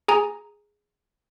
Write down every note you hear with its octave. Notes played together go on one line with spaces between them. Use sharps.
G#4 G#5 A#5